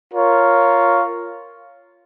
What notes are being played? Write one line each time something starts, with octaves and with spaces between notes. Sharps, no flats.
F4 A#4 C#5